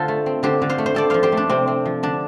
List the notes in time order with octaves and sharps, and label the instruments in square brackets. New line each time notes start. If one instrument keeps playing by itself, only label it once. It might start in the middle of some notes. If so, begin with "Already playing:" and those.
Already playing: [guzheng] D3 F4 A4 C5
A3
C4
D3 G4 C5
D3
C5 F5
A3
C5
C4 A4 D5
F3 C5 F5
G4 C5
A3
D4
C3 C4
C4
F3
D3 D4